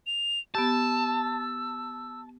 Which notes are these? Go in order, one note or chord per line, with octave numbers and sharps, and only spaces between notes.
F7
B3 G4 A5 E6